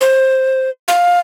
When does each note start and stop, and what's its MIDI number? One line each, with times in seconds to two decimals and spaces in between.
0.01 0.70 72
0.88 1.19 77